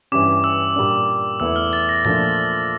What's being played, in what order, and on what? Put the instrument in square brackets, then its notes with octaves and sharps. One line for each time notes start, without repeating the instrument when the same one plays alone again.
[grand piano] G2 E3 G3 C#4 [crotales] D6
[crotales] E6
[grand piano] A#2 G3 A#3 D4
[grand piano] E2 E3 A3 E4 [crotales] E6
[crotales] F6
A6
A#6
[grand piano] A#2 F3 A3 D4 [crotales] A6